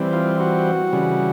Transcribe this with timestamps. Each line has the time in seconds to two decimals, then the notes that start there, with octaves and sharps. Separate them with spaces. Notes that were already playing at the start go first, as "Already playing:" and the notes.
Already playing: E3 G3 C4
0.13 F4
0.40 F#4
0.93 C#3 E3 G3